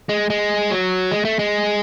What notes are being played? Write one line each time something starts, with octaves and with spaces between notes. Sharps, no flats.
G#3
G#3
F#3
G#3
A3
G#3